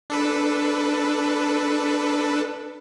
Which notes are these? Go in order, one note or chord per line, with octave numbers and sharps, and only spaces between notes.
D4 A4 B4